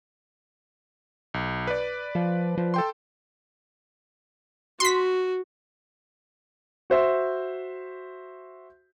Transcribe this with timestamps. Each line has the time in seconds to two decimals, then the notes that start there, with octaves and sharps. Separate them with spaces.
1.34 B1
1.67 B4 D5
2.15 F3
2.57 F3
2.74 A4 G5 C6
4.80 F#4 C6 B6
6.90 F#4 C5 E5